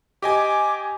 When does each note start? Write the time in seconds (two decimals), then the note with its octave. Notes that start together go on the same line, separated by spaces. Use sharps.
0.22 G4 D#5 G#5 D6